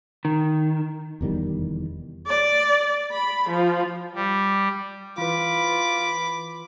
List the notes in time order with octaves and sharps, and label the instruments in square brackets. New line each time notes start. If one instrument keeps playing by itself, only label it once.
[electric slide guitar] D#3
[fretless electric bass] F1 E2 D#3 G3
[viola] D5
B5
F3
[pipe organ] G3
[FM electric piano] E3 B4 [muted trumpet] F4 [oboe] B5 [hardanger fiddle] D6